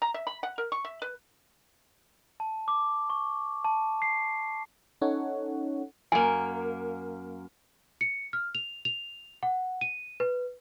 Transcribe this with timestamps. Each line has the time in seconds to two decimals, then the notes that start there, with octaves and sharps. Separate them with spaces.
0.02 A#5
0.14 E5
0.27 B5
0.43 F#5
0.58 A#4
0.72 C#6
0.85 E5
1.02 B4
2.40 A5
2.68 D6
3.10 C#6
3.65 A5
4.02 C7
5.01 C#4 D#4 A4 C#5 F#5
6.12 F#2 A#3 G#5
8.01 C#7
8.33 F6
8.55 F7
8.85 F7
9.43 F#5
9.81 D#7
10.20 B4